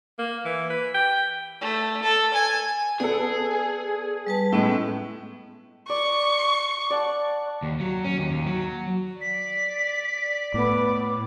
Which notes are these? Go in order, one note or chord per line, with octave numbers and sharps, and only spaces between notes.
A#3
E3
B4
G5
A3
A4
G#5
B3 G#4 A4 D5
G3 B4 A5
A2 G#3 B3 C#4 E4
D5 C#6
D5 F#5 A5
D#2
F#3
C#4
D#2
D#2
F#3
D5 B6
A2 B3 D6